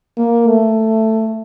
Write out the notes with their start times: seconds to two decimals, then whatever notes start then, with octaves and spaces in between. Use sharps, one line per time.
0.17 A#3
0.47 A3